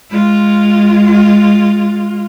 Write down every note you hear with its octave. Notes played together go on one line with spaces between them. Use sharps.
G#3 F4